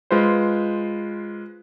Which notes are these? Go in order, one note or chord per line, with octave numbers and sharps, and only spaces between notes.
G#3 F4 B4 C5